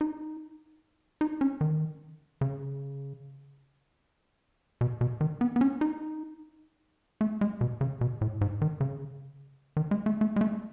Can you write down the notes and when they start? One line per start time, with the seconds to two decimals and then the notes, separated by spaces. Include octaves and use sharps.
0.01 D#4
1.21 D#4
1.41 C#4
1.61 D#3
2.41 C#3
4.81 B2
5.01 B2
5.21 D#3
5.41 B3
5.56 B3
5.61 C#4
5.81 D#4
7.21 A3
7.41 G#3
7.61 B2
7.81 C#3
8.01 B2
8.21 A2
8.41 G#2
8.62 D#3
8.81 C#3
9.77 D#3
9.91 G#3
10.06 A3
10.21 A3
10.36 G#3
10.41 A3